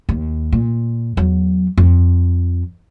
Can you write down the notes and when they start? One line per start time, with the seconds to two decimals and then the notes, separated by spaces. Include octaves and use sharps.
0.09 D#2
0.52 A#2
1.17 E2 F#3
1.78 F2